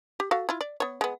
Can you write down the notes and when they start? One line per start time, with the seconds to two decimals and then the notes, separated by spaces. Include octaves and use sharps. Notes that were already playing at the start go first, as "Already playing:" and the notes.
0.20 G4
0.31 F#4 A4 F5
0.49 E4 F4
0.61 D5
0.80 B3 C#5
1.01 G#3 B3